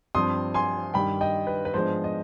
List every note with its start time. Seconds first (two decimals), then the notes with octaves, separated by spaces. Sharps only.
0.15 G2 F3 C4 C6 D#6
0.54 G#5 C6
0.94 G2 D#3 G3 G5 B5
1.21 D#5 G5
1.47 B4
1.65 B4
1.74 G#2 F3 G#3 B3 D4 C5
2.04 D#5